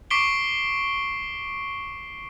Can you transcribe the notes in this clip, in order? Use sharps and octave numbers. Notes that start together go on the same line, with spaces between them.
C#6 D6 B6 C7 D7 G7